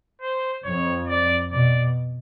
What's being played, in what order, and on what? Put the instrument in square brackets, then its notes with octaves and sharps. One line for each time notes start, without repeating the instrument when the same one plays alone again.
[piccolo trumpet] C5
[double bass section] F2 [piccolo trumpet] C#5
[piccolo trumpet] D5
[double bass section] B2 [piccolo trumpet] D5